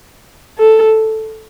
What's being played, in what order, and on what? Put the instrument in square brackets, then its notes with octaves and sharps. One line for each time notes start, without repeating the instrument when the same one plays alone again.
[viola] A4